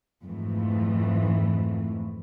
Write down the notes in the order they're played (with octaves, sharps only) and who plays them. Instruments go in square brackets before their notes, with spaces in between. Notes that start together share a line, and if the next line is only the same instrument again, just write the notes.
[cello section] F2 G#2 E3 A3